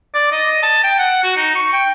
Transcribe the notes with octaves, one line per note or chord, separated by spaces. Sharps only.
D5
D#5
A5
G5
F#5
F#4
D#4
C#6
G5